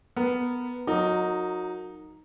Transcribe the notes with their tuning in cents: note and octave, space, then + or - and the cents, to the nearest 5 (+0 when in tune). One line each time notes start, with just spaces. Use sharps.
B3 +0 A#4 +0
F#3 -25 D#4 +0 A#4 -25